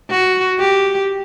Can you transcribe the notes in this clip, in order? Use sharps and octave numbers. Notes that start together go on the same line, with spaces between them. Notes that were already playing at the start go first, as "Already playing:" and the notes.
F#4
G4